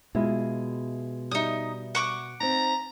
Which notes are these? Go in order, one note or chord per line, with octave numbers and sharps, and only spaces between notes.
B2 G#3 E4 F4
G3 D#4 E5 D#6
F#5 C#6 D6
C4 D#4 A#5